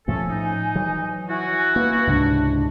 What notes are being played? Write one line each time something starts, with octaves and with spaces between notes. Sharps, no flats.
A2 F3 A3 C#4 A4 G#5
D#4
E3 F#3
E4 F#4 G#5
A#3 B4
C#2 G#2 C3 D4